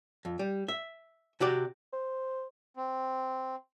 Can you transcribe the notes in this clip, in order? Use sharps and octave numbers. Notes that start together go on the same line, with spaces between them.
F2
G3
E5
C3 F#4 G4 D5
C5
C4